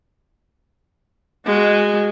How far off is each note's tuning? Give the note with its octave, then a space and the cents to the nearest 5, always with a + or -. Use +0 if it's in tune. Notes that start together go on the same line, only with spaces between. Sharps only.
G#3 -10 F#4 +0